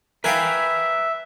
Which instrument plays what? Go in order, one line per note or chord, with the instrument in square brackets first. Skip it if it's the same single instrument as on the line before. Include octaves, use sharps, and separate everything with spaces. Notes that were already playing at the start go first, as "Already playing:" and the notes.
[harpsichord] A#4 F5 G5 [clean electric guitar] B4 G#5 [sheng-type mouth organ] E5